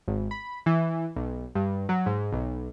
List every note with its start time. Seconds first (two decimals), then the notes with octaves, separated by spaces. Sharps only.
0.08 G#1
0.31 B5
0.66 E3
1.16 B1
1.55 G2
1.89 F#3
2.06 G#2
2.32 B1